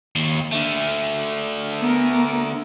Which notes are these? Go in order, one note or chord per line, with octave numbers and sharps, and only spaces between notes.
D#2
D3 A3
B3 A#4